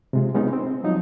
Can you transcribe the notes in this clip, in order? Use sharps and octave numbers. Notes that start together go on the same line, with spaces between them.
C3 G#3 F4
G#3 B3 C#4 D#4 F4
C4
F3 F#3 D#4